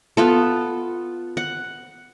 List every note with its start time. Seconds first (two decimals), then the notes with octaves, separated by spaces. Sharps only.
0.17 B3 F4 A4
1.37 F#5